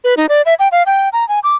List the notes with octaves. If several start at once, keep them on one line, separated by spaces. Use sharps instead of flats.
B4
D#4
D5
E5
G5
F5
G5
A#5
G#5
D6